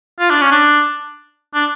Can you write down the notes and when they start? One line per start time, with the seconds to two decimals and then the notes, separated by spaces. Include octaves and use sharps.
0.19 F4
0.30 D4
0.41 C#4
0.51 D4
1.54 D4